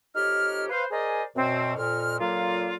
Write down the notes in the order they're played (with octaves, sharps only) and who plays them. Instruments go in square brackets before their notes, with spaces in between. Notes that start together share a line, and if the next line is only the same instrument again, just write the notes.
[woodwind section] F2 D#4 G4 C#5 F6
B4 C5 F5
G#4 A#4 C5 D5 D#5 G#5
F#2 B2 C4
F2 A#2 F6
A#2 D3 F#3 A#3 F4